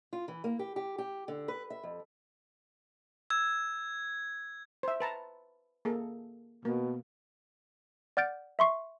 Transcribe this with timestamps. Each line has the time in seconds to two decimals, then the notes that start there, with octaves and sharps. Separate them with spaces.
0.13 F4
0.28 E3
0.44 A#3
0.59 G4
0.76 G4
0.98 G4
1.28 D3
1.48 B4
1.70 E5
1.83 F2
3.30 E6 G#6
4.83 C5 E5
5.00 B4 A5 A#5
5.85 A#3 G#4 A4
6.65 B2 A#3
8.17 D5 F#5 F6 G6 A6 D7
8.59 E5 C6 C#6 C7